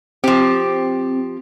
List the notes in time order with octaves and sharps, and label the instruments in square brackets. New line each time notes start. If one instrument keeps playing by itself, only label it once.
[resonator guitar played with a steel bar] F3 G4 [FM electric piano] C4